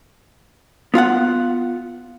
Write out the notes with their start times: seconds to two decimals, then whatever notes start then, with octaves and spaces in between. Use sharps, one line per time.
0.94 B3 F4 F5 F#5